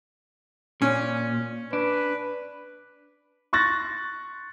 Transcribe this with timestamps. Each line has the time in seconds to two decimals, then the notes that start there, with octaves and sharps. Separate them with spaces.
0.82 A#2 C#4
1.73 D4 B4
3.53 C6 C#6 F#6 A6 A#6